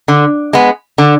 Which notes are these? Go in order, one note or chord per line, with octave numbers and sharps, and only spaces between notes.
D3
G#3 B3
D3